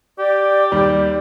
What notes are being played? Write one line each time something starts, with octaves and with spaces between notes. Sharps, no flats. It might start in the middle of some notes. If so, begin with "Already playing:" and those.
G4 D5
D#2 G3 D5